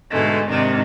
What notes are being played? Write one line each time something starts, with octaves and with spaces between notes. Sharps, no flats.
G#2 B2 D3 G#3 A3
G#2 C3 D#3 D4 D#4